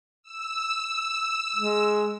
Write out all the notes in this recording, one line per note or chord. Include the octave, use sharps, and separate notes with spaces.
E6
G#3